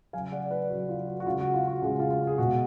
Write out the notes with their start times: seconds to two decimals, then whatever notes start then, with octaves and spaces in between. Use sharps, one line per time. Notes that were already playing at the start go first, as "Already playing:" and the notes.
0.13 C#3 F#3 F5 G#5
0.32 D5 F#5
0.50 B4 D5
0.69 C#3 F#3 F#4
0.89 F4
1.07 F#4
1.20 F#4
1.27 C#3 G#3 F4
1.40 F#4
1.54 F4
1.67 F#4
1.82 C#3 G#3 F4
1.99 F4
2.10 F4
2.27 G#4
2.38 B2 G#3 F#4